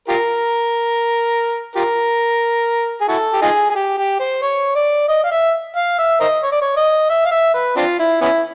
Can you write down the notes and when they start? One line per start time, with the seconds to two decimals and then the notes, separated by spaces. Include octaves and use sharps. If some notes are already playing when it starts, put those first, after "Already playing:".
0.08 F4 G4 A#4
1.75 F4 G4 A#4
3.01 G#4
3.08 E4 F#4 A4
3.33 G4
3.42 D#4 F4 G#4
3.70 G#4
3.75 G4
3.97 G4
4.20 C5
4.42 C#5
4.75 D5
5.08 D#5
5.24 F5
5.32 E5
5.76 F5
5.99 E5
6.20 A#4 C5 D#5
6.43 C#5
6.52 D5
6.61 C#5
6.76 D#5
7.10 E5
7.25 F5
7.32 E5
7.54 B4
7.76 C4 D4 F4
7.99 E4
8.21 B3 C#4 E4